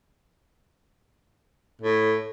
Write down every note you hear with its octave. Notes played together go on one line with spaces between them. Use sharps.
A2